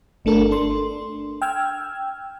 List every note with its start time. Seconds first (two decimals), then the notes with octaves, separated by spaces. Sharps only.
0.25 G1 A3 D4 A4 A#4
0.51 D4 C6
1.42 G5 E6 F6 G#6